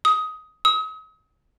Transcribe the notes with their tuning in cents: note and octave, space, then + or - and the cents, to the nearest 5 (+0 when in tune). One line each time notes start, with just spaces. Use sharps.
D#6 +15
D#6 +40